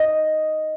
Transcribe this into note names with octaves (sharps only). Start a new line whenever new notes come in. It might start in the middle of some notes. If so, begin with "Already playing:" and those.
Already playing: D#5